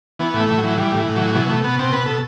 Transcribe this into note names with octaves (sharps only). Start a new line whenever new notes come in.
E3 B3
A2
A3
A2
F#3
E3
E3 G3
A2
E3
A2
F#3
E3
B2 F#3
B2 A3
B2 B3
B2 C4
B2 B4
B2 A4